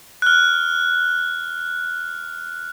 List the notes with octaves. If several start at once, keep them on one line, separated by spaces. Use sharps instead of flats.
F6 F#6